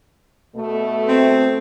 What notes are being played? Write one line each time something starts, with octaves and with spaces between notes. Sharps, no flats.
B2 A3
C4